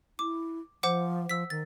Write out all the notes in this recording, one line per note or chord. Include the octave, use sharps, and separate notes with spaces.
E4 D6
F3 C5 F#5 D6
F3 E6 B6
D#3 A6